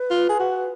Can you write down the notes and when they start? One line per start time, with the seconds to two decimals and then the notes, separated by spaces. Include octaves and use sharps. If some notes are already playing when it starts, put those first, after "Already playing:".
Already playing: B4
0.11 F4
0.29 G#4
0.40 F#4